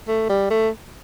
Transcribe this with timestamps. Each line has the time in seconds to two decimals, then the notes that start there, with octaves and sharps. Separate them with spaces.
0.08 A3
0.29 G3
0.50 A3